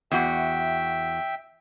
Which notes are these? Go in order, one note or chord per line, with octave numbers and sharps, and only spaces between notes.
E2 F#4 E5 G5